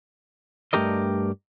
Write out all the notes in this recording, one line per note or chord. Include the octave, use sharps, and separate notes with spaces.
G2 A3 D4 G4 A#4 D#5